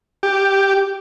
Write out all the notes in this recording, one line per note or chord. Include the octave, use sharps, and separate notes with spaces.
G4